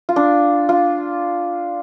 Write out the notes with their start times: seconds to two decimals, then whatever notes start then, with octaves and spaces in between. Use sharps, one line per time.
0.09 F4
0.16 D4
0.69 F4